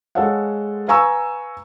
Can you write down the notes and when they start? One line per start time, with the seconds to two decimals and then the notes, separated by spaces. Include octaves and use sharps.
0.15 G#3 A4 C5 C#5 F5 F#5
0.88 B4 F5 G#5 A#5 C#6 E6